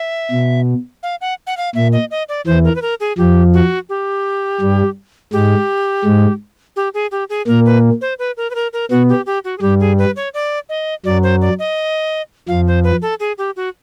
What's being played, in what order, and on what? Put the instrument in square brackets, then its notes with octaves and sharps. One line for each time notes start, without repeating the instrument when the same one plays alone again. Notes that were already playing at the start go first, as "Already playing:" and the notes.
Already playing: [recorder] E5
[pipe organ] B2
[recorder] F5
F#5
F#5
F5
[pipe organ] A#2 [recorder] E5
[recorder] D#5
D#5
D5
[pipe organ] E2 E3 [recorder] C5
[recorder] A#4
B4
A#4
G#4
[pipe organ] F2 F3 [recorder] G4
[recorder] F#4
G4
[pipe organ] G2 G3
[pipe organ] G#2 G#3 [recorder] G4
[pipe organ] G#2 G#3
[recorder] G4
G#4
G4
G#4
[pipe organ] A#2 A#3 [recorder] A#4
[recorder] B4
C5
B4
A#4
B4
A#4
A#4
[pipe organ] B2 B3 [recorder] F#4
[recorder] G4
G4
F#4
G#4
[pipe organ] G2 G3 [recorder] G4
[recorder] G#4
B4
C#5
D5
D#5
[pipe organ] F#2 F#3 [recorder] D5
[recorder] C5
D5
D#5
[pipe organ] F2 F3 [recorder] F5
[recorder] C5
B4
A4
G#4
G4
F#4